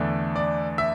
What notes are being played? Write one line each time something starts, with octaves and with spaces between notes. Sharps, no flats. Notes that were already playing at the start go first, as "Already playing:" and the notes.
Already playing: E2 D3 A3
D5
E5